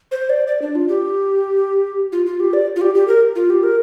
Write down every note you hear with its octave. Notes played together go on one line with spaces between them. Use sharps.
C5
D5
D5
D4
F4
G4
F4
F4
G4
D5
F4
G4
G4
A#4
F4
G4
A#4